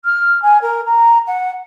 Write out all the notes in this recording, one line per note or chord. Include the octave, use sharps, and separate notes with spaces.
F6
G#5
A#4
A#5
F#5